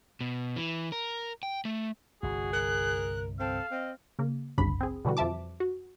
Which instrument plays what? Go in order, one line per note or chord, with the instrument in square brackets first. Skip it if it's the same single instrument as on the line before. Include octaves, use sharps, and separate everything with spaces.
[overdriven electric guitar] B2
E3
A#4
G5
A3
[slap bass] G1 C2 [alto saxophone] F#4 [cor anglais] G#4
[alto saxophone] A#4 [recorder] F#6
[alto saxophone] C4 [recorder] A4 [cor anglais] F5
[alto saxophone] C4 [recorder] D#5
[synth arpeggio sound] C#3 A#3
G1 C2 F#2 C#3 D4 B5
C4 G#4
B2 D3 E3 G3 F#4
F2 F3 E5 A5 D6
F#4